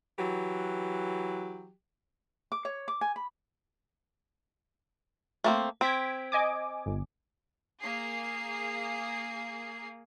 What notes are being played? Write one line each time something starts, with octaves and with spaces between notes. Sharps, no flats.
E3 F#3 G4
D6
C#5
D6
G#5
B5
A3 A#3 C4
C4 G#6 B6 D7
D#5 G#5 D6
G1
A#3 G#4 C7